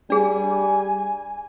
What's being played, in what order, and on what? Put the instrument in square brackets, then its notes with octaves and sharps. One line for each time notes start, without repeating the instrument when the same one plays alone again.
[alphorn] G3 [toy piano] D4 G#4 [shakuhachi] G#5